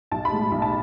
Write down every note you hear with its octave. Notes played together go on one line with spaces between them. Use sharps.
B1 A5
B5
A2 G#3
B1 B5
A5